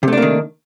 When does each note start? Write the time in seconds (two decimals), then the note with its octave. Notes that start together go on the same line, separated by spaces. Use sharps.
0.03 C3
0.08 A3
0.13 D4
0.17 A#3
0.22 D#3